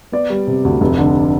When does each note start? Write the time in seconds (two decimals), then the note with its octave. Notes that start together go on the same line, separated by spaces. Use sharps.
0.12 B3 D5
0.30 G3
0.47 C3
0.65 D2
0.81 F1
0.98 D3